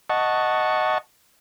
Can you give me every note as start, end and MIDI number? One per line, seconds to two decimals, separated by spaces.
0.10 0.98 75
0.10 0.98 78
0.10 0.98 81
0.10 0.98 85